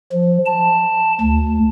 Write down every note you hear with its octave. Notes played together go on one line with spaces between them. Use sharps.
F3
A5
D2